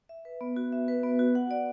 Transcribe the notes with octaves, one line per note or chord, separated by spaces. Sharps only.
E5
B4
B3
F#4
E5
B4
B3
F#4
F#5
D5